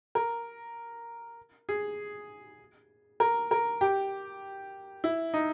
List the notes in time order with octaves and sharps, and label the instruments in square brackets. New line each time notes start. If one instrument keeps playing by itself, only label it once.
[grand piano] A#4
G#4
A#4
A#4
G4
E4
D#4